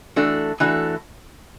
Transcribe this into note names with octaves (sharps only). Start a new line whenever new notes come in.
E3 A3 D4 F#4 A4
E3 A3 D4 F#4 A4